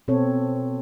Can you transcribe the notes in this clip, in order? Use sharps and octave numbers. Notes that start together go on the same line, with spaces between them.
B2 C4 A4 C#5